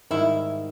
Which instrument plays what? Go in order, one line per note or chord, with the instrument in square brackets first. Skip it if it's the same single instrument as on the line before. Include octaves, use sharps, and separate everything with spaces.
[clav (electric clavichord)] G#2 D#3 G3 [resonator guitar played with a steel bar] E4